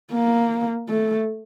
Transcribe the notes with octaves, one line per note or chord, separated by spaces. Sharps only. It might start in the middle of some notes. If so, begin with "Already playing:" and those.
A#3
A3